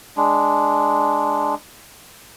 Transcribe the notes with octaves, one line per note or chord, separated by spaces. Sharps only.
G#3 D4